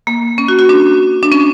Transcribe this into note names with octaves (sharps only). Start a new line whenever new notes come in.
A#3
C#4
F#4
F#4
D4
D4
C#4